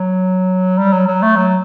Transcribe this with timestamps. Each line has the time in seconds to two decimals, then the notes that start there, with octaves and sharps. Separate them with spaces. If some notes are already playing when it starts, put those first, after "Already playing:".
Already playing: F#3
0.78 G3
0.93 F#3
1.07 F#3
1.22 A3
1.36 F#3